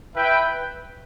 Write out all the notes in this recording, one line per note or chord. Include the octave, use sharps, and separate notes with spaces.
E4 B4 E5 G5